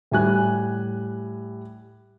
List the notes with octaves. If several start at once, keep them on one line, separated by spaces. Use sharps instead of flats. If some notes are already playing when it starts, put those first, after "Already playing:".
A2 G3 G#5 F#6